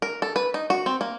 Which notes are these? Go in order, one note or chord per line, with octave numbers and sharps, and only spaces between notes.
A#4
A4
B4
D#4
F#4
C4
A#3